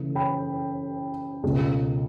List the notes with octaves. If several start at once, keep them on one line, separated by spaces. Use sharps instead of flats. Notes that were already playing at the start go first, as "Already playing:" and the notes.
Already playing: C#3 E3 A3
G5 B5
C#2 B2 A3